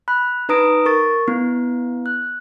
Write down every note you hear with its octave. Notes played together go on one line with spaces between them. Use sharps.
B5 F#6
D#4 B4 A#5 D#6 A#6 D7
A#4 C#6 A6
B3 E4
F#6